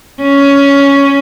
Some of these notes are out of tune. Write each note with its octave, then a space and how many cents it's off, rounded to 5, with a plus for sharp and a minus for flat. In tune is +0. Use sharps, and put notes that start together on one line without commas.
C#4 +10